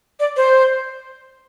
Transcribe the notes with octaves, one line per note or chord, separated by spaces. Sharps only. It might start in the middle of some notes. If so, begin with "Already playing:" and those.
D5
C5